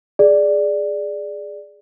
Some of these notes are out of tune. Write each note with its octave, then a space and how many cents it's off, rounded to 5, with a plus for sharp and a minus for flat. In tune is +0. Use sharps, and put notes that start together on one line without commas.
G#4 +0 D5 +0